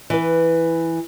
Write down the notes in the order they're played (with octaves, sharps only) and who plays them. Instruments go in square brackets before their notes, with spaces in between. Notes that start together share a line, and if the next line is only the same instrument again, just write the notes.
[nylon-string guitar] E3 B4